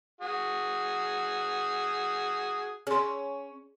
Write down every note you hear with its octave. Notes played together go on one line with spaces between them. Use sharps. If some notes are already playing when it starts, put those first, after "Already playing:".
F#4 G#4
C#4 G#4 C6